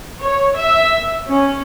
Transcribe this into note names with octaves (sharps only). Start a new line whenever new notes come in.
C#5
E5
C#4